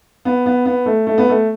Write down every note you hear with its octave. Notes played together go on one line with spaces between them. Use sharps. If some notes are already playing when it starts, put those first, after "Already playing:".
B3
B3
B3
A3
A3
B3
A3